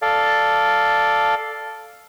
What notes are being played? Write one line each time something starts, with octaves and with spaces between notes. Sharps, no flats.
A4 D5 F5